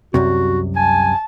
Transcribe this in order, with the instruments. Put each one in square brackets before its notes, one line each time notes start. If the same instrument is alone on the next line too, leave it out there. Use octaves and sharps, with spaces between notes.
[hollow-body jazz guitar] C2 F#2 C3 [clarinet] F#4
[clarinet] G#5 [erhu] A5